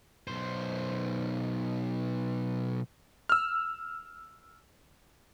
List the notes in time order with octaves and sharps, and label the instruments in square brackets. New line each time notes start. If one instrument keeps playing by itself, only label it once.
[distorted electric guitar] B1 C5
[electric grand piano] E6 F6